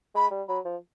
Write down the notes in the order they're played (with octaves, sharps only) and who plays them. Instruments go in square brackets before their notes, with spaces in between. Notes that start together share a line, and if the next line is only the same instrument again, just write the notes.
[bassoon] G#3 [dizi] B5
[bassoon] G3
[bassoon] F#3 [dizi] B5
[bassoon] F3